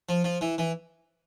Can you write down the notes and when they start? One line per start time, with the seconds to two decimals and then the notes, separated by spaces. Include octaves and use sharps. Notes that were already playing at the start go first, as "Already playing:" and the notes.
0.09 F3
0.24 F3
0.41 E3
0.58 E3